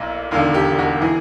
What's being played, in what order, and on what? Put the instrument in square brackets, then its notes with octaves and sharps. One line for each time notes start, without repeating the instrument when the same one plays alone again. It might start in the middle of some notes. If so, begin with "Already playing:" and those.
Already playing: [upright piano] B1 A#2 E4
E1 D#2 D3 F4
G4
F#4
E3 G#4